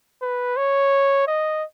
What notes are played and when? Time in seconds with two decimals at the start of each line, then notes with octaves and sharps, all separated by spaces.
0.22 B4
0.57 C#5
1.27 D#5